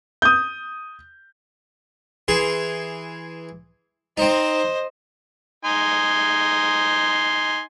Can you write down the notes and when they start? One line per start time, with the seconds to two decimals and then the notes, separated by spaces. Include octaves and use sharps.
0.22 D#6 G6
2.28 E3 G#4 C6
4.17 C4 D#4 C5 D#5
5.65 D#4 G#5 C6